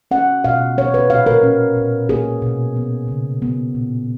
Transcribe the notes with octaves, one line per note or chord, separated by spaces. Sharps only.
C#4 F#5
B2 F5
C#4 C#5
B4
A#2 F5
A#4
C#4
A#2
A#3 G#4
B2
B3
C#3
B3
A#2